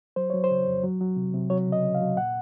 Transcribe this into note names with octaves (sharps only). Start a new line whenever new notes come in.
F#3 C5
F#3 C#5
C5
C#3
F2
F#3
F#3
C3
C3
F#3 C#5
C#3
D#5
C#3
F5
F#3
A#2 F#5